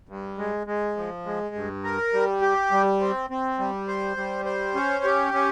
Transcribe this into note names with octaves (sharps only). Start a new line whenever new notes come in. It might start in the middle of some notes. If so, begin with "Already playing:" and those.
G2
G#3
G#3
F3
G#3
G2
A#4
G3
G4
G3
C4
C4
G3
C5
G3
C5
C#4
G4
C#4